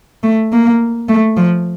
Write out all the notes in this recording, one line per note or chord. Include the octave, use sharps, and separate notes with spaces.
A3
A#3
A3
F3